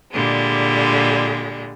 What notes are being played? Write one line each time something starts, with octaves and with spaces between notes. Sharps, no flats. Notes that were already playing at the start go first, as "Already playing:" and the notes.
A#2 D3 G3 G#3